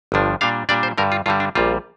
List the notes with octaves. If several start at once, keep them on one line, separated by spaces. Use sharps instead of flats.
G1 G2 F3 D4
A#2 G3 D4 F5
A#2 G3 D4 D5
C5
G2 D3 G3 A#4
F4
G2 D3 G3 F4
D4
A#1 A#2 G3 F4